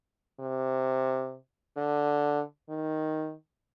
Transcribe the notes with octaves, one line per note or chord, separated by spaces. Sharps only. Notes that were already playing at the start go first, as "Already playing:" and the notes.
C3
D3
D#3